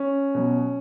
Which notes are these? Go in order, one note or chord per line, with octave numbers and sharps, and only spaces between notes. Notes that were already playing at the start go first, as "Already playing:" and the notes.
Already playing: C#4
B2 F#3